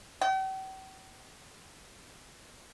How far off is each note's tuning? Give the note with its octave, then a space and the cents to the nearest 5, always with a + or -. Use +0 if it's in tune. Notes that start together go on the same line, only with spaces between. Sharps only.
G5 -45